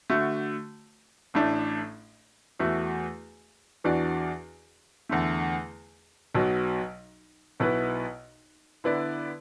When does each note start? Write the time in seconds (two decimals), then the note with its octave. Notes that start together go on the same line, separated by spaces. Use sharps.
0.10 D3 A3 F#4
1.34 A1 A2 A3 D4
2.60 E2 E3 A3 F#4
3.84 E2 E3 D4 F#4 D5
5.09 E2 D3 A3
6.34 B1 B2 F#3
7.60 B1 B2 B3 E4 B4
8.84 D3 B3 E4 B4 D5